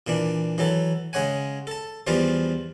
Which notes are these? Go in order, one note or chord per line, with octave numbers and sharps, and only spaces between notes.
A#2 E3 D4
E3 F#3 A4
C#3 G#3 C#5 F#5 G#5
A4 A5
E2 E3 F3 G3 F4